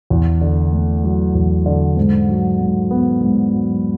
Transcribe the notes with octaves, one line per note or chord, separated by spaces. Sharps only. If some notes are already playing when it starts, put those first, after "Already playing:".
E2
D3
A3
F#3
E2
D3
G#2
F#3
G#2
B3
G#2
F#3